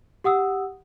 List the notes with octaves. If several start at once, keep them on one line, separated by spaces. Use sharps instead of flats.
G4 F#5 D#6 E6